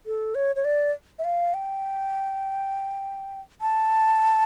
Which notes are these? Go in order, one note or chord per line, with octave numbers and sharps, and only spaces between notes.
A4
C#5
C#5
D5
E5
F5
G5
A5